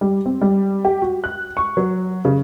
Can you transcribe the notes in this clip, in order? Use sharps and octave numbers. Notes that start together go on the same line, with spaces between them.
G3
C4
G3
G4
F#4
F#6
C#6
F#3
C#3